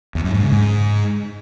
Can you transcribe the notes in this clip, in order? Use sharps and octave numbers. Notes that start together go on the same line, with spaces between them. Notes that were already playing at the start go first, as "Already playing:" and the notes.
E2
F#2
G#2
C#3
G#2